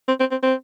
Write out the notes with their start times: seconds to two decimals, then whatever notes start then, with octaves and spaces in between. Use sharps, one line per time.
0.08 C4
0.20 C4
0.31 C4
0.43 C4